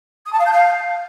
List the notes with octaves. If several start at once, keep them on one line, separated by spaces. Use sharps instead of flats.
D#6
A5
F5
G6
F5